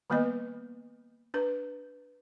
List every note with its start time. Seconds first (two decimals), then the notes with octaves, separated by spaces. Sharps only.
0.10 D#3 G3 A#3 B3 B4 D#5
1.34 D4 B4